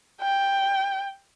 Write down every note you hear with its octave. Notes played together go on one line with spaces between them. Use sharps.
G5